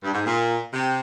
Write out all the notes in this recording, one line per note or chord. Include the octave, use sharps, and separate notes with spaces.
G2
G#2
A#2
C3